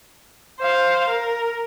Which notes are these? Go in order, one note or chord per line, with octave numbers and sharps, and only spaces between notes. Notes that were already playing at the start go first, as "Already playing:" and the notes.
C5 F5
A#4